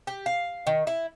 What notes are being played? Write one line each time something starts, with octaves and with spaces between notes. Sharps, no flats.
G4
F5
D#3
E4